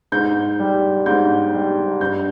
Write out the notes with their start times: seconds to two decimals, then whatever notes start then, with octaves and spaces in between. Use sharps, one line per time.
0.12 G#2 G6
0.59 G3
1.06 G#2 G6
1.54 G3
2.00 G2 G6